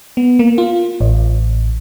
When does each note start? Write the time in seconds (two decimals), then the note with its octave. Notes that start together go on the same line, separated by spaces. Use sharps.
0.17 B3
0.39 A#3
0.58 F4
1.01 A1